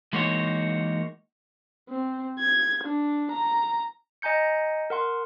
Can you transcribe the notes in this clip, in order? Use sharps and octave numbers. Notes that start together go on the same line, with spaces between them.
E3 G#3 A#3 D#4 F#4 C#5
C4
G#6
D4
A#5
D#5 G#5 A#5 G6 C#7
A#4 F#5 C6